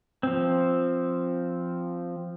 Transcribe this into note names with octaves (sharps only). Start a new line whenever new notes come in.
F3 C4